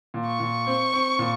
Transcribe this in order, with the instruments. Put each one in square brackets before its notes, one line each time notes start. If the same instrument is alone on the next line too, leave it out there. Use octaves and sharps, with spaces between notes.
[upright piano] A#2
[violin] C#6
[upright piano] A#2
C4
C4
A#2